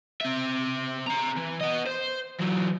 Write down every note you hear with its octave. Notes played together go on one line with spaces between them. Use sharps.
C4 E5
C4 A#5
E3
B3 D#5
C5
E3 F#3